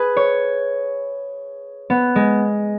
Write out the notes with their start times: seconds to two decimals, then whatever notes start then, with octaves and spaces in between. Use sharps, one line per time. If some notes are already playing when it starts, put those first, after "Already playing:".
Already playing: G#4 B4
0.17 C#5
1.90 B3
2.16 G#3